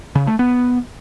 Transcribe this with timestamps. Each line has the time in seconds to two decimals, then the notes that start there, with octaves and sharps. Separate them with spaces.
0.15 C#3
0.27 A3
0.39 B3